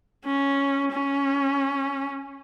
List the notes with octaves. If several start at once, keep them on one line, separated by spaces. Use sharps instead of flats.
C#4
C#4